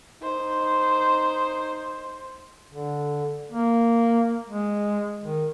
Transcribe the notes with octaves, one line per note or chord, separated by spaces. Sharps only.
D#4 C5
D3
A#3
G#3
D#3